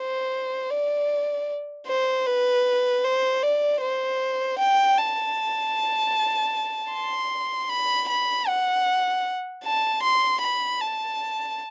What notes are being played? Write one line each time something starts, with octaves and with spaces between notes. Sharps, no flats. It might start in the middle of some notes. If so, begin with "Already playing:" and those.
Already playing: C5
D5
C5
B4
C5
D5
C5
G5
A5
C6
B5
B5
F#5
A5
C6
B5
A5